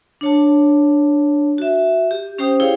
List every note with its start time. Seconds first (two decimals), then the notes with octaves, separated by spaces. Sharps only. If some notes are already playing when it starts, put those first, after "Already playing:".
0.21 D4 C#5 A5
1.58 F#4 E5
2.11 G4
2.38 C#4 G4 C5 G5 D#6
2.60 E4 G#4 C#5 F5